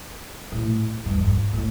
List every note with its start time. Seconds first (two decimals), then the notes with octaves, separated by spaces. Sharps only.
0.52 A2
1.06 G2
1.15 F2
1.24 G2
1.53 A2